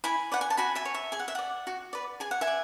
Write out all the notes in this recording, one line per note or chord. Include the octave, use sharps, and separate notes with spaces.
E4 G#5 B5
B4 D5 F#5
G#5
A5
F#4 G#5 B5
E5 G#5
C#5
E5
G#4 G#5
F#5
E5
D5 F#5
F#4
B4 D5
G#4 G#5
F#5
E5 G#5
D5